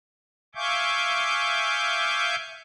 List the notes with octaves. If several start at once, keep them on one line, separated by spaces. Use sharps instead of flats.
E5 F5 G#5 C#6 D6 G6